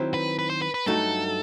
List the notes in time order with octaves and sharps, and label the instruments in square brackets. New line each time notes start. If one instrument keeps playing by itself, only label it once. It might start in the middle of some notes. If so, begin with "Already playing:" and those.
Already playing: [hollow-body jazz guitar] D#3 F#3 C4 E4
[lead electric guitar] B4
B4
C5
B4
B4
[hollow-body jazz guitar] G2 F#3 A3 D#4 F#4 [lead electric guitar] A4